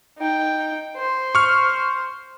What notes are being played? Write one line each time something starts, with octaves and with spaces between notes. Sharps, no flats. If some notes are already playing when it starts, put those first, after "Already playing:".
D#4 G5
C5
C#6 F6